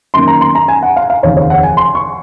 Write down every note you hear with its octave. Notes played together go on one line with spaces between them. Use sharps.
F#2 D#3 A#3 C6
A#5
C6
A#5
G#5
F#5
F5
F5
F1 D#2 C#3 C#5
C#5
F#5
G#5
C6
C#6